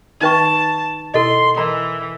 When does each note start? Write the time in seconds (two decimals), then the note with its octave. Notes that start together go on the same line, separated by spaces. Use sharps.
0.21 D#3 D#4 B4 E5 G5 A5 C#6
1.14 B2 E4 A4 D#5 C6
1.58 E3 A#4 D#5 A#5